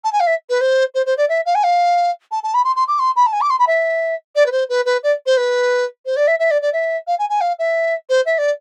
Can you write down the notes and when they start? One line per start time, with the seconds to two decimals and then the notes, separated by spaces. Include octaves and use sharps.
0.04 A5
0.13 G#5
0.20 F5
0.27 E5
0.50 B4
0.61 C5
0.95 C5
1.06 C5
1.17 D5
1.29 E5
1.46 F5
1.55 G#5
1.64 F5
2.32 A5
2.43 A5
2.54 B5
2.64 C6
2.76 C6
2.88 D6
2.99 C6
3.16 B5
3.26 A5
3.33 G#5
3.41 D6
3.50 C6
3.59 B5
3.67 E5
4.35 D5
4.46 B4
4.52 C5
4.69 B4
4.85 B4
5.03 D5
5.26 C5
5.37 B4
6.06 C5
6.16 D5
6.27 E5
6.39 E5
6.51 D5
6.62 D5
6.73 E5
7.07 F5
7.19 G#5
7.30 G#5
7.41 F5
7.59 E5
8.09 C5
8.26 E5
8.38 D5